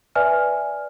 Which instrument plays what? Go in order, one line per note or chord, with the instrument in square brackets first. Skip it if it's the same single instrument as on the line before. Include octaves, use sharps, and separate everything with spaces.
[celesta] B4 D5 E5 G#5 F6